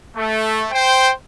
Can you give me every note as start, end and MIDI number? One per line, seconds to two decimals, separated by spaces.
0.17 0.66 57
0.72 1.11 72
0.72 1.11 79